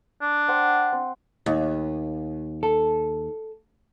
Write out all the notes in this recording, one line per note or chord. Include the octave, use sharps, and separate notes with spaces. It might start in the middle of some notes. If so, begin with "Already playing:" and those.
D4
C5 F#5 G5
C4
D#2
A4